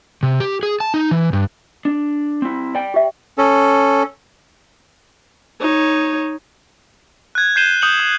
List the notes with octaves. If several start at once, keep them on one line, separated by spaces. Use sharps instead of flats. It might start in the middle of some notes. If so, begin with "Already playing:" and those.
C3
G4
G#4
A5
D#4
E3
G2
D4
C4 E4
D5 G5
G4 E5
C#4 A4
D#4 C#5
F#6 G#6
G6 G#6 C7 D#7 E7 G7
D#6 G6 C#7 F#7
D#6